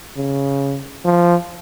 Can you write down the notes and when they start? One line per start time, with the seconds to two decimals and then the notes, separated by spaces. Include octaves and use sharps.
0.16 C#3
1.04 F3